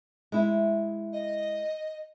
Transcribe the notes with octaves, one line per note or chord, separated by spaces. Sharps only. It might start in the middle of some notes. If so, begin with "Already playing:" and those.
G#3 E4
D#5